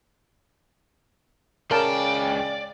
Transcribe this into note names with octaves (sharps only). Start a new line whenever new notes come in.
C#2 C#3 A#4 D5 G5 A5